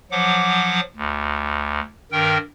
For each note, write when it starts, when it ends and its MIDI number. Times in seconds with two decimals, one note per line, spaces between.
0.11 0.80 53
0.11 0.80 54
0.11 0.80 78
0.11 0.80 86
0.97 1.80 38
2.12 2.38 43
2.12 2.38 51
2.12 2.38 70
2.12 2.38 79